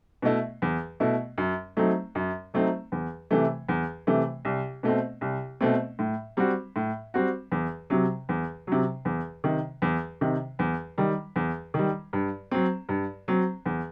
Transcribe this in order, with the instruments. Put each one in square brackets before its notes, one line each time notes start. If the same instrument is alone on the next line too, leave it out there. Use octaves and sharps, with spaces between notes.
[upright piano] B2 A3 E4
E2
B2 A3 E4
F#2
F#3 A3 C4 D#4
F#2
F#3 A3 C4 D#4
E2
C3 E3 A3
E2
C3 E3 A3
C2
B2 A3 C4
C2
B2 A3 C4
A2
G3 C4 F#4
A2
G3 C4 F#4
E2
C3 F#3
E2
C3 F#3
E2
C3 D#3
E2
C3 D#3
E2
D#3 G3
E2
D#3 G3
G2
F#3 C4
G2
F#3 C4
E2